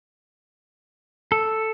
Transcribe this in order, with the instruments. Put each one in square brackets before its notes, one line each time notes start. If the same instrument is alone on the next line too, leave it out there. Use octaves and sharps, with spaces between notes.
[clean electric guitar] A4